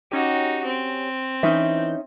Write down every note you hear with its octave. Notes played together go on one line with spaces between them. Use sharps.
C#4 D#4 F#4 G4
C4
E3 C#4 D#4 E5 G6